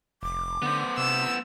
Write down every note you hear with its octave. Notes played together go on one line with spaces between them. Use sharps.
F1 D6
D3 B3 C5
C3 E6